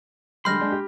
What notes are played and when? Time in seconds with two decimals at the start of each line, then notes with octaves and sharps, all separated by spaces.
0.45 D3 G3 G#3 G5 B5 C6 F6 A#6
0.60 G#3 D4
0.72 G4